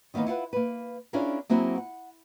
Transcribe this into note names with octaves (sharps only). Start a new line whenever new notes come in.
D#3 E3 A#3 B3 D#4
E4 F4 B4 F#5
A#3 B4
C#4 D4 E4 F4 G#4 A#4
F#3 A#3 C4 E4 F#4 G#4
F#5